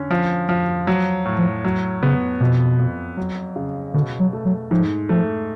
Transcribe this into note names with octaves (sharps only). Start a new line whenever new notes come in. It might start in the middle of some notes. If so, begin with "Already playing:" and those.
Already playing: D3 C#4
F3
F3
F#3
A2
F3
F#3
C#3 B3
F2 B2
F2
F#3
C#3
B2 D3
F#3
A3
F#3
G#2 F3
F3 A3